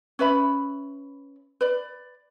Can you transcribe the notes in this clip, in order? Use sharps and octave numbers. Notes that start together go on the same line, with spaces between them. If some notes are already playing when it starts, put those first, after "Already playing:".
C#4 B4 E5 B5
B4 D5